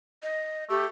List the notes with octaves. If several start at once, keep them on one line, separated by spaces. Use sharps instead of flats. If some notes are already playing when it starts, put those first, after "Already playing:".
D#5
A3 G4